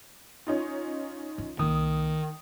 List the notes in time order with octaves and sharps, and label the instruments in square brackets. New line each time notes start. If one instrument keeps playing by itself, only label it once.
[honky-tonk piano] C#4 D#4 F4
[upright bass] E3
[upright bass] C2 A#3 [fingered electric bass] D#3 [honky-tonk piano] D#6